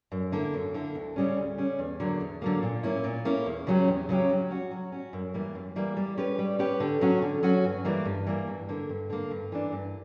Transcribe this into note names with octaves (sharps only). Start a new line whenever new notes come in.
F#2
D3 A#3 E4
F#2
D3 A#3 E4
D2
C#3 G3 C#4
D2
C#3 G3 C#4
E2
D3 F#3 A#3
E2
D3 F#3 A#3
A#2
A#3 C#4 E4
A#2
A#3 C#4 E4
E2
C#3 F#3 C#4 G4
E2
C#3 F#3 C#4 G4
F#3
C#4 F#4
F#3
C#4 F#4
F#2
E3 G3 A#3
F#2
E3 G3 A#3
G3
C#4 G4 B4
G3
C#4 G4 B4
D3
F#3 C#4 F#4
D3
F#3 C#4 F#4
G2
E3 G3 A#3
G2
E3 G3 A#3
G2
D3 A#3
G2
D3 A#3
G2
E3 A#3 D4
G2